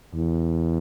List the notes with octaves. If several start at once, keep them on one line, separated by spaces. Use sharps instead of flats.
E2